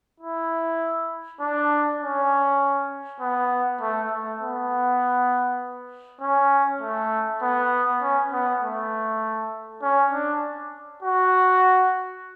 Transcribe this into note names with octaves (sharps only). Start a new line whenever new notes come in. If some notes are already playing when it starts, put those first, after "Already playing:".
E4
D4
C#4
B3
A3
A3
B3
C#4
A3
B3
C#4
B3
A3
C#4
D4
F#4